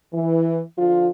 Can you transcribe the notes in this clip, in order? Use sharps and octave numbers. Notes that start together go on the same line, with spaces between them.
E3
D3 F3 F4